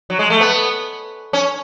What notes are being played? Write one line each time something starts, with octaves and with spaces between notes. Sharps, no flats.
F#3
G#3
A3
B3
C#4